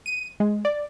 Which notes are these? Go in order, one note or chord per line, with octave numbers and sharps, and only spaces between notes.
D#7
G#3
D5